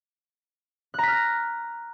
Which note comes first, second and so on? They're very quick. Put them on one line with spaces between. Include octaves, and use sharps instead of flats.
F#6 A#5 B6 F6 A#6